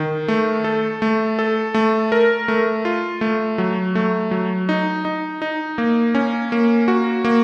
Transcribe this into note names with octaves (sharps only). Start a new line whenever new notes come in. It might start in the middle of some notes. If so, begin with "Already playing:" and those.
Already playing: D#3
A3
A4
A3
A4
A3
A#4
A3
F4
A3
F#3
A3
F#3
D#4
D#4
D#4
A#3
C#4
A#3
F#4
A#3